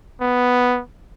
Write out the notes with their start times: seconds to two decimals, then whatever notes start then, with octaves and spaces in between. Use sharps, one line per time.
0.21 B3